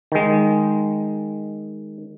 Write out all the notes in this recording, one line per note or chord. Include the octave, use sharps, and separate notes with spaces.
D#3 G#3